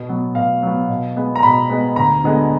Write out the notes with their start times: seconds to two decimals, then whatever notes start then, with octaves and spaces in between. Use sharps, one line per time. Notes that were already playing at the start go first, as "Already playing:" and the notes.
Already playing: B2
0.09 F#3 B3
0.35 B2 F5
0.63 F#3 B3
0.89 B2
1.16 G#3 B3
1.36 A#5
1.43 B2 B5
1.70 G#3 B3
1.96 D2 A#5
2.24 D3 G#3 B3